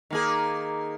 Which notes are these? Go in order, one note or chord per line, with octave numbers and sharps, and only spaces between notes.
D#3 A#3 G#4